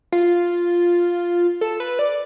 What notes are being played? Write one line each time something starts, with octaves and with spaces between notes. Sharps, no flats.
F4
A4
B4
D5